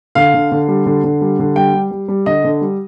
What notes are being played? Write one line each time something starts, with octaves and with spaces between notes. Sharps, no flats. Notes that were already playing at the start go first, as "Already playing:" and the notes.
D3 F5
D3
D3
G3
D3
D3
G3
D3
G3 G5
G3
G3
G3
D3 D#5
D3
G3